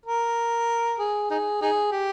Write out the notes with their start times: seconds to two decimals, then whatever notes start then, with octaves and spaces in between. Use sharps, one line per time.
0.06 A#4
0.99 G#4
1.31 D#4 G#4
1.62 D#4 G#4
1.92 G4